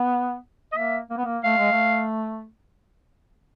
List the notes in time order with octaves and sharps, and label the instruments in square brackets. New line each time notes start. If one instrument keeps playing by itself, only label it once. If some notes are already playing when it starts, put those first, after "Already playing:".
Already playing: [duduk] B3
[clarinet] D#5
[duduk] A#3 [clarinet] E5
[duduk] A#3
B3
A#3
[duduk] A3 [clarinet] F5
[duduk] G#3
A3